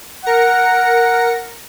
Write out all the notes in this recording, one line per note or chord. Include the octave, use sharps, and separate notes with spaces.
A#4 F#5 A#6 C#7